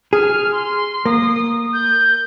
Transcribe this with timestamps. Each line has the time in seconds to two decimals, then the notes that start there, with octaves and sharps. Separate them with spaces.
0.13 G#4 F6
0.52 C6
1.06 A#3 D#6
1.73 G6